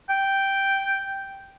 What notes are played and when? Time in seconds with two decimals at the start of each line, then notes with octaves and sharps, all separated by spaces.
0.10 G5